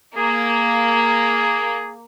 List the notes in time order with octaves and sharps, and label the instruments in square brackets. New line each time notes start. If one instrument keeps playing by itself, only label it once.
[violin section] A#3 [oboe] G#4